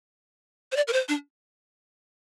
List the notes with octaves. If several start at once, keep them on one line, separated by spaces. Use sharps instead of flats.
C5
D5
A#4
C5
D4